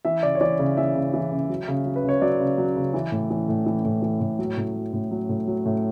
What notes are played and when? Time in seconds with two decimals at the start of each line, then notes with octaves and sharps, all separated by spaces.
0.05 E3 E5
0.23 C#3 D5
0.35 C#5
0.41 E3 D5
0.59 C#3
0.77 E3 E5
0.95 C#3
1.14 E3
1.32 C#3
1.49 F#3
1.68 C#3
1.86 F#3
1.96 B4
2.04 C#3 C#5
2.22 F#3 D5
2.40 C#3
2.58 F#3
2.76 C#3
2.94 E3
3.12 A2
3.30 E3
3.48 A2
3.66 E3
3.85 A2
4.02 E3
4.20 A2
4.39 F#3
4.57 A2
4.75 F#3
4.93 A2
5.11 F#3
5.29 A2
5.47 F#3
5.65 A2